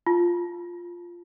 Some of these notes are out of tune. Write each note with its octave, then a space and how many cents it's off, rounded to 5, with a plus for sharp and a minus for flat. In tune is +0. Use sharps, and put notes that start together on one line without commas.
F4 +0 A5 -5